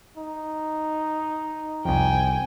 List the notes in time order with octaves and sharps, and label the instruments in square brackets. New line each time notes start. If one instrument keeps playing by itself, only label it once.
[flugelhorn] D#4
[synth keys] C2 F2 [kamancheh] G5 G#5